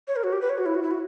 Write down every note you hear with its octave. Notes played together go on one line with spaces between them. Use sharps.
C#5
A#4
F#4
G4
B4
C#5
F#4
E4
F#4
E4
F#4